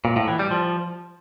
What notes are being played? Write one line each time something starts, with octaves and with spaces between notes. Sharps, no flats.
A#2
A2
E3
G3
F3